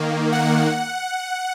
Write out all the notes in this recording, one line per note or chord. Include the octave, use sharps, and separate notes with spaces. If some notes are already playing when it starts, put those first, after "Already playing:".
Already playing: D#3 A#3
F#5